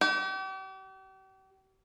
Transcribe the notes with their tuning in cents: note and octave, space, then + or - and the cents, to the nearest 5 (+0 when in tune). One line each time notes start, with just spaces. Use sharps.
G4 -40